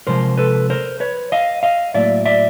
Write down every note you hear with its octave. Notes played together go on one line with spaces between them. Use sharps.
C3 F3 G#3 A#4 C5
A4 B4
A#4 C5
B4 C#5
D#5 F5
D#5 F5
A2 F#3 A#3 D5 E5
D5 E5